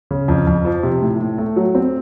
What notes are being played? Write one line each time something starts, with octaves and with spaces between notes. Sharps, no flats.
C#3
F2
F2
F3
C3
A2
A2
A3
F#3
C4